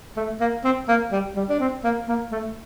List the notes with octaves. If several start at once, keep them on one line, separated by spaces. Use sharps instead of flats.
A3
A#3
C4
A#3
G3
G3
D4
C4
A#3
A#3
A3